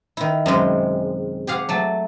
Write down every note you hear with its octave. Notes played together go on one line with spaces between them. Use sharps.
D#3 E4
F#2 C3 G#3
G4 G#4 F5 F#5
F#3 A3 A5